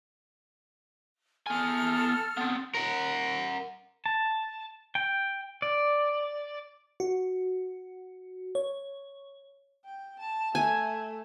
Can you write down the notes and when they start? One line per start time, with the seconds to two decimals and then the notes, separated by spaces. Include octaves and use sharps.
1.47 B3 A4 G#5 F6
2.37 B3 C4
2.75 A#4 F#5
4.06 A5
4.95 G5
5.62 D5
7.00 F#4
8.55 C#5
9.85 G5
10.19 A5
10.55 A3 G#5